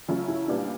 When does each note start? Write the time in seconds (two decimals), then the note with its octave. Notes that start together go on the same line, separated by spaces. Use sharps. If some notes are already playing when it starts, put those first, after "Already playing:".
0.08 C#3 F#3 A3 C#4 F4
0.28 E4
0.48 A#2 G3 B3 D4